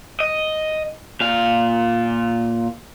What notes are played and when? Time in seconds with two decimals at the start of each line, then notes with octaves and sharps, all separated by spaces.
0.20 D#5
1.21 A#2 F5